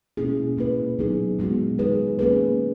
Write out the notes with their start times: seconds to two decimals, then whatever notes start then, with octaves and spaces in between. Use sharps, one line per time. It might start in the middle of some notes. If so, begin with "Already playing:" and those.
0.17 B2 A#3 C#4 E4 G#4
0.57 A#2 A#3 E4 B4
0.99 D#3 F#3 B3 D#4 G#4
1.39 A#2 G#3 B3 F#4
1.78 D#3 G#3 D#4 G#4 B4
2.19 D#3 A#3 C#4 G#4 B4